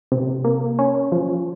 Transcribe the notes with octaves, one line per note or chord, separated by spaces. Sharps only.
C3
A#3
C#4
F3